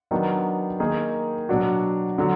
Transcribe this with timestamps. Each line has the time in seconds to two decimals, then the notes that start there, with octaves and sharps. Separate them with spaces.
0.11 D#3 F#3 B3 D4
0.80 D#3 A#3 D#4 G#4
1.49 B2 F#3 D4 F#4
2.18 D3 F#3